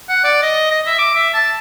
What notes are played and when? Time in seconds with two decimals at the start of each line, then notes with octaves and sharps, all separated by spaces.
0.09 F#5
0.24 D5
0.43 D#5
0.71 D#5
0.87 E5
0.99 D6
1.15 E5
1.34 A5